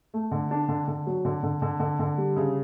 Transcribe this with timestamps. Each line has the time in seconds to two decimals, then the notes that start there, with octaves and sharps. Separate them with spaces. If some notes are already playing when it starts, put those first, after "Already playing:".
0.14 A3
0.31 D3
0.51 D4
0.68 D3
0.88 D3
1.07 F#3
1.25 D3
1.43 D3
1.62 D3
1.80 D3
1.99 D3
2.18 G3
2.36 C#3